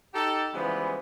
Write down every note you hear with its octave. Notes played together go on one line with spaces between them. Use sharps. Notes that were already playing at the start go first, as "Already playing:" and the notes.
D#4 G4 A4
C#3 E3 F3 G3 G#3 B3